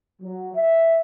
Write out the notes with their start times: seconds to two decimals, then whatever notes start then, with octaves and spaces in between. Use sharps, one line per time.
0.22 F#3
0.55 E5